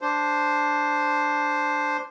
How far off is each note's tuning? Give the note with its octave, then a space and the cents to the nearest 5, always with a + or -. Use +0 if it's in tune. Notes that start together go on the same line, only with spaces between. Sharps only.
D4 +0 C5 +0